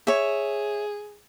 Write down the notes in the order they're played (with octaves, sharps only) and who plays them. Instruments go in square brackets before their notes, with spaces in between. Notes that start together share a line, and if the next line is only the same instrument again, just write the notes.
[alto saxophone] G#4 [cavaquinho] C#5 E5